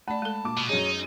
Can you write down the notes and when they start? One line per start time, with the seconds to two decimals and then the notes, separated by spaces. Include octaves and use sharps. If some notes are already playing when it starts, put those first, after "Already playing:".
0.08 A3 D5 A5 B5
0.22 G#3 A4
0.44 A#2 D6
0.57 B2
0.69 F#2 D#4 G#4 C#5